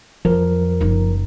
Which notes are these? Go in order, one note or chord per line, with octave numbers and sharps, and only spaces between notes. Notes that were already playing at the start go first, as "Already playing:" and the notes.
F2 F3 A#4
F#1 D#4